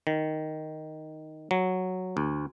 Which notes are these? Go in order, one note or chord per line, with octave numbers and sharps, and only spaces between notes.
D#3
F#3
D2